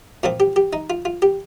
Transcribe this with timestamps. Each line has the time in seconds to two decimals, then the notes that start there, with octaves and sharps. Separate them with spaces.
0.23 A#2 F3 C4 F4
0.40 G4
0.56 G4
0.73 D#4
0.90 F4
1.05 F4
1.22 G4